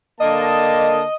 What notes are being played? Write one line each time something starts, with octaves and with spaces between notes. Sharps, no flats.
D3 A#3 D#5 A5